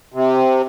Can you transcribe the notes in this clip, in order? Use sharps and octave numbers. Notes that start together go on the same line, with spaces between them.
C3